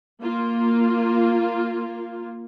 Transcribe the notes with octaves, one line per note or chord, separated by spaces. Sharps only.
A#3 F4